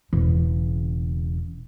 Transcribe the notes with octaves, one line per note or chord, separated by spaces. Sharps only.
E1 C#3